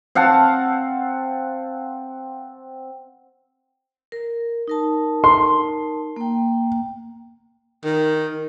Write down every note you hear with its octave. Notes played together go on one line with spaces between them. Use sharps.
C4 F5 F#5 A5
A#4
D#4 A#4 A5
C6
A#3 G5
D#3